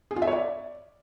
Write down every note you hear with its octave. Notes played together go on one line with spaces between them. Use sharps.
G#4
F4
E5
C#5
D5